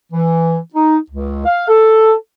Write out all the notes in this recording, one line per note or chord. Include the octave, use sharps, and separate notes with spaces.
E3
D#4
C#2
F5
A4